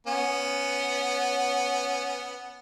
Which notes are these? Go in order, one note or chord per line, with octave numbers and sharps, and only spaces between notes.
B3 C#4